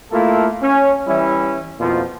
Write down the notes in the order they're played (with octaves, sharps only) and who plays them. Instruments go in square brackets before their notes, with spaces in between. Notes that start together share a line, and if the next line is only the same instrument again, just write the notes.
[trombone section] A3 A#3 E4 F4 A4
C#4
E3 G3 C#4 E4
F2 B2 F3 A#3 E4 F4